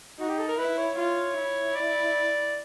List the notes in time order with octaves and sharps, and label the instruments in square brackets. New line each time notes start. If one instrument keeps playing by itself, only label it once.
[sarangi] D#4 [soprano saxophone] F#4
[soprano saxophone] G4
A4
A#4
[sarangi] E4 [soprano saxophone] B4
[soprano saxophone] C#5
[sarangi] F4
E4
[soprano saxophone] D5